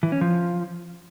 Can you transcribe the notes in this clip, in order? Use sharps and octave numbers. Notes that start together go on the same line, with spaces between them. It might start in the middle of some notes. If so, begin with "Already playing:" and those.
E3
C#4
F3